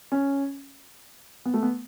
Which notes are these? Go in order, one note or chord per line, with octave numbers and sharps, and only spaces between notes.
C#4
B3
A3
B3